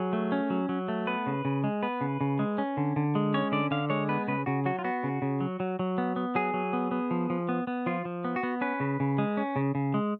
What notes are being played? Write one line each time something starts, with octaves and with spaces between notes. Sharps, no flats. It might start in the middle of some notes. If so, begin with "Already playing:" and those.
Already playing: F#3 G#4
A3
C#4
F#3
F#3
A3
B3 B4
C#3
C#3
G#3
B3 B4
C#3
C#3
G#3
C#4
D3
D3
G#3
C#4 C#5
D3 D5
D3 F5
G#3 C#5
B3 B4
C#3 B4
C#3 F#4
F#3 F#4
F4
B3 F#4
C#3
C#3
F#3
F#3
F#3
B3
B3
F#3 G#4
F#3
B3
B3
F3
F3
B3
B3
F3 F4
F3
B3
F#4
B3
C#4 B4
C#3
C#3
G#3
C#4
C#3
C#3
G#3